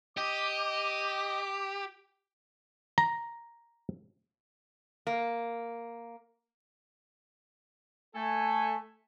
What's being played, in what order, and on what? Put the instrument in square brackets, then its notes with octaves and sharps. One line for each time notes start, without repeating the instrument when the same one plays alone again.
[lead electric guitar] G4 [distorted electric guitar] D#5 [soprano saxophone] D6
[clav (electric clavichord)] A#5
[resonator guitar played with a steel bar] A#3
[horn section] A3 A4 G#5